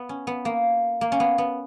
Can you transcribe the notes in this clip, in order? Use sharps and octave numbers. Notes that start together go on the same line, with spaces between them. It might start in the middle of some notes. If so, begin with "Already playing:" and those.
Already playing: B3
C#4
B3
A#3
A#3
C#4
B3
B3